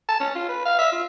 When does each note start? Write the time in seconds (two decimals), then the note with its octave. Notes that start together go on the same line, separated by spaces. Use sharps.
0.09 A5
0.20 C#4
0.35 F4
0.49 B4
0.66 F5
0.79 E5
0.92 F4